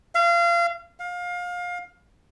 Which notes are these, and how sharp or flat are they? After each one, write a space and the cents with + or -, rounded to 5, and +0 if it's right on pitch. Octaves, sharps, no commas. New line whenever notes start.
F5 -30
F5 +25